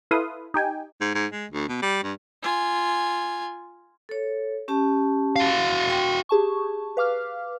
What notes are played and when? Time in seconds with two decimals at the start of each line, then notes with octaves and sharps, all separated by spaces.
0.11 E4 A4 B4 F5 C6 D#6
0.54 D#4 G4 G5 G#5
1.01 G#2
1.15 G#2
1.31 G#3
1.51 D2
1.68 B2
1.82 G3
2.03 G2
2.42 F4 G#5
4.09 A4 C#5
4.68 C#4 G4 A5
5.36 F#4 F5
5.89 G5 C6
6.29 G4 G#4 A5 C#6
6.97 B4 F5 D6 F6